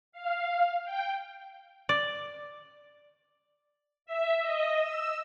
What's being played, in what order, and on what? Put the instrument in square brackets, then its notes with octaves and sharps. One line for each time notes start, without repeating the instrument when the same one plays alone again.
[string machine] F5
G5
[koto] D5
[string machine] E5
D#5
E6